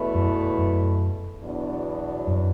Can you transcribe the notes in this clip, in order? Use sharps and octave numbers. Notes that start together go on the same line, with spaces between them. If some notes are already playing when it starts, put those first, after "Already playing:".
Already playing: E2 B2 A3 E4 B4
F#2
F#2
E2 B2 F#3 B3 D4
F#2